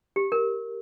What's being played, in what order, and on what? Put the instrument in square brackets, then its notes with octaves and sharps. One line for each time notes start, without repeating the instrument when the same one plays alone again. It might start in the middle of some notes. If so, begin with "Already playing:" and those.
[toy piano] G4
A#4